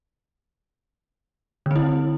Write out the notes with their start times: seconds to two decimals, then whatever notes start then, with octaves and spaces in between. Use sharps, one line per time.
1.66 D3
1.71 C4
1.76 E4